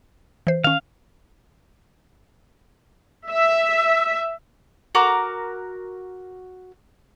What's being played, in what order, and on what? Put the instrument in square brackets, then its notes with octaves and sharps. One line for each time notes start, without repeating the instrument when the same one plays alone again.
[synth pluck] E3 C5
[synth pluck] D#3 C#4 [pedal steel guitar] F5
[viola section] E5
[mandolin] F#4 A#4 D6